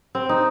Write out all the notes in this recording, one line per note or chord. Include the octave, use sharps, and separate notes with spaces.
C4
D#4